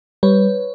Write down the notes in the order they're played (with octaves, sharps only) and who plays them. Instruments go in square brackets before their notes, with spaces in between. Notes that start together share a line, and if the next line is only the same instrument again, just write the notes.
[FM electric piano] G3 B4 C#5